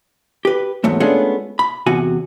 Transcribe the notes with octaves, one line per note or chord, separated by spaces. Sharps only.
G4 B4
E2 G#2 F#3 A3
G#3 A3 B3 C#4 D4 F4
B5
E2 C3 F#4 G#5